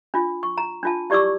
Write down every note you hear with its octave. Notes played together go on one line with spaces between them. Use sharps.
D4 F4
C#6
A#5
D4 F4 A5
E4 G4 D5 C#6 D6 E6